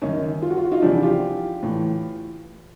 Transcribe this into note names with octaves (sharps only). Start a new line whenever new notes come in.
F#2 D#3 C#4 D#4
F4
F#4
F4
F#4
D#4 F4
E2 C3 F3 D4 E4
F4 G4
A2 E3